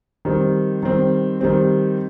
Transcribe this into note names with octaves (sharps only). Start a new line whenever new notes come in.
D#3 G3 C4
D#3 G3 C4
D#3 G3 C4